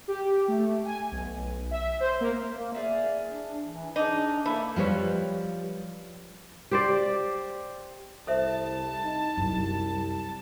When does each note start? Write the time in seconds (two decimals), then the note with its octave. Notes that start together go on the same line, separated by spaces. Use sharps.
0.08 G4
0.48 A3
0.85 G#5
1.12 B1
1.71 E5
2.00 C5
2.21 A#3
2.50 A#3
2.75 E4 G#4 D5 F5
3.30 D4
3.64 E3
3.96 D4 D#4 G#4 D5
4.46 E3 A#3 E4 A4 G#5
4.76 F3 G3 B4 C#5
6.71 G4 C5 D5
8.27 C2 A4 C5 E5 A5
9.04 D#4
9.37 C2 F#2 E4